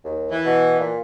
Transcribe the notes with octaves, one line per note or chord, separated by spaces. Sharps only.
D#2
E3
B2
A#2